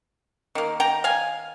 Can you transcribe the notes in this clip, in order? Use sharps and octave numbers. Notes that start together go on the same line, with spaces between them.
D#3 A#3
G5 A#5
F5 G#5